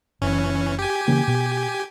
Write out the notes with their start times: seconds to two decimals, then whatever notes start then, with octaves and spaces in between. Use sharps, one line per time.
0.22 F#1 E3 C#4
0.79 G4 G#5
1.08 C#3 E3 A#3
1.28 B2